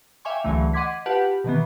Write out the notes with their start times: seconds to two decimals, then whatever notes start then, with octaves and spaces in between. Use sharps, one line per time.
0.25 E5 F5 G5 G#5 C#6 D6
0.44 C#2 D3 E3 F#3 A3
0.73 D#5 F#5 C6 D6 G#6 B6
1.06 F4 G4 B4 F#5 A5
1.44 B2 D#3 E3 B3